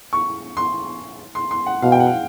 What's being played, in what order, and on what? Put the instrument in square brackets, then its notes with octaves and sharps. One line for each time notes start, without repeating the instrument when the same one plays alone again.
[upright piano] C#6
C6
C6
C6
F#5
[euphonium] B2 [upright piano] F5
[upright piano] G5
F#5
F5